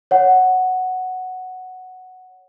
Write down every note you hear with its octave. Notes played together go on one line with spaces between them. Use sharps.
C#5 F#5